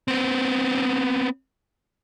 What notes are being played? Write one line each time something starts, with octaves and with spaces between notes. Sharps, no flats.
B3 C4